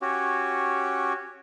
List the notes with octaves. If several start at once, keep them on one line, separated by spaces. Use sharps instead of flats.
C#4 F#4 G4